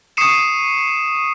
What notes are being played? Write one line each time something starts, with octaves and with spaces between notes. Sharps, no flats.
C#6 D#6 C7 C#7 D#7 E7